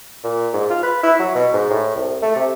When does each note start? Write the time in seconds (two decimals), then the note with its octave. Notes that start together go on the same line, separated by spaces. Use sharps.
0.24 A#2
0.53 G#2
0.70 F4
0.83 B4
1.03 E4
1.19 F#3
1.35 B2
1.53 G#2
1.70 A2
1.96 C2
2.22 A3
2.36 C3